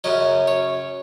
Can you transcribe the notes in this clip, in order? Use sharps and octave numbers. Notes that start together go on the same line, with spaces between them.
F#2 C#3 F#3 D#5
C#5